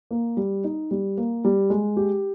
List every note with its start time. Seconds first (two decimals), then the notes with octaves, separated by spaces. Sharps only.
0.11 A#3
0.37 G3
0.64 D#4
0.91 G3
1.18 A#3
1.45 G3
1.70 G#3
1.97 G4